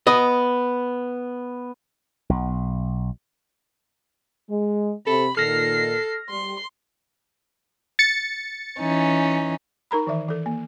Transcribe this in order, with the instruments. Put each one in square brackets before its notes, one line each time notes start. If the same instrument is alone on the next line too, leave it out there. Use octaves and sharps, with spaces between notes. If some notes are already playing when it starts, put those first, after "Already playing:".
[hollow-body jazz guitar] B3 D#5
[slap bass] B1
[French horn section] G#3
[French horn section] C3 [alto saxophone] A4 [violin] B5
[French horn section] A#2 D#3 [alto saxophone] A4 [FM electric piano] F6 A#6 [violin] C7
[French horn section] G3 [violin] C6
[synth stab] A6 C#7
[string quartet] E3 C#4 D#4
[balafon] D#4 A#4 A#5 B5
D#3 E3 E5
E3 A4
A#3